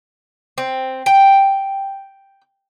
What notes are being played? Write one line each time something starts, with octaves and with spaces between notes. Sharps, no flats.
C4
G5